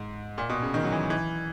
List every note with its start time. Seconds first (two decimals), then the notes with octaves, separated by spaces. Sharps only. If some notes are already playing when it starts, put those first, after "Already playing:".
Already playing: G#2
0.38 A#2
0.49 B2
0.62 C#3
0.74 D#3
0.84 F#3
0.92 E3
1.10 E3